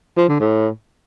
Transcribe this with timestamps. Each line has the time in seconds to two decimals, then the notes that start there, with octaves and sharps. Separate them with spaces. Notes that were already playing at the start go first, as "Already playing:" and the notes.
0.17 F3
0.28 D3
0.40 A2